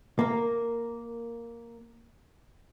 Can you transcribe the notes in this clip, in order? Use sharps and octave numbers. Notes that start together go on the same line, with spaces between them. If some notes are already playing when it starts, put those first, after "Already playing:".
A#3 A#4